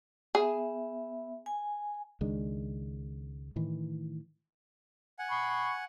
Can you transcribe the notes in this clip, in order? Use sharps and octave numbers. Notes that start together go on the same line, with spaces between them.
B3 G#4 E5
G#5
C#2 D#3 G#3 D4
A2 D#3 E3
F#5 G#5
B5 C#6